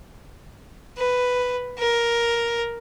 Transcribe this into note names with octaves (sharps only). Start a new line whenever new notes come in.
B4
A#4